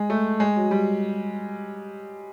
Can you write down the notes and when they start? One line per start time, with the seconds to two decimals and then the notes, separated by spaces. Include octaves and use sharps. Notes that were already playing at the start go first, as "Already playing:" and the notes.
Already playing: G#3
0.10 A3
0.40 G#3
0.56 F#3
0.71 G3